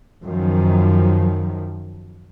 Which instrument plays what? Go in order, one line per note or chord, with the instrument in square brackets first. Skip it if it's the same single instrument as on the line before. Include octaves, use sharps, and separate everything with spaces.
[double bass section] F#2 D#3 F3